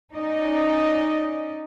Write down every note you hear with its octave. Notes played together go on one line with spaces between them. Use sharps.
C#4 D#4 D5 D#5